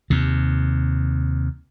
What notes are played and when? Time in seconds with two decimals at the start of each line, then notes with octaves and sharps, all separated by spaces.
0.10 D#2 C3